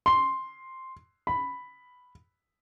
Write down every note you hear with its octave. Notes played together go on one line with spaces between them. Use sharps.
C6
B5